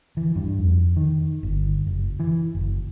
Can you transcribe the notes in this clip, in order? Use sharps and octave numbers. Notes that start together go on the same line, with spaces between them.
E3
G2
F2
D#3
G1
F#1
E3
F#1